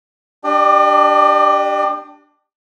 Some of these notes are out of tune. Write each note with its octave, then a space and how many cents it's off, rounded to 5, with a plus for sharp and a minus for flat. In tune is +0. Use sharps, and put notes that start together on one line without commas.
D4 +0 G4 +0 D5 +45